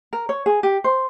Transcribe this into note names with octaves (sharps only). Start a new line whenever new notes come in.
A#4
C#5
G#4
G4
C5